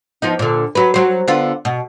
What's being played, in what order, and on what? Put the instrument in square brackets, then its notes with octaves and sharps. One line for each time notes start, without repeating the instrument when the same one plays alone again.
[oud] F3 B3 D#4
A#2 D3
F#3 B4
F#3 C5
D3 B3 F4
B2